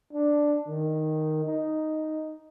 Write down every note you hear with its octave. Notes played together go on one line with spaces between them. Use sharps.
D4
D#3
D#4